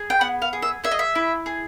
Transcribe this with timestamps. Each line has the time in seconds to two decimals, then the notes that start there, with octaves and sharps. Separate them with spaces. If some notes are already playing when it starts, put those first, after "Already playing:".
Already playing: G#4
0.10 G5
0.21 B3 F#5
0.42 F5
0.53 G#4
0.62 E5
0.84 G#4 E5
0.91 D#5
0.99 E5
1.15 E4
1.46 G#4